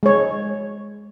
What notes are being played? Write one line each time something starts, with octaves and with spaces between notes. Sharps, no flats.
G#3 C#5